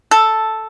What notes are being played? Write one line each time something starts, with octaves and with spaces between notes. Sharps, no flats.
A4